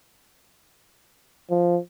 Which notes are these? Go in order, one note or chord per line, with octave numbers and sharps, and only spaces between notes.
F3